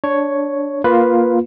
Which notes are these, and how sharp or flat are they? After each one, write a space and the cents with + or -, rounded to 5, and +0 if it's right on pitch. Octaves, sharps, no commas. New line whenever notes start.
D4 -10 C#5 +0
A#3 +15 F4 +0 B4 +0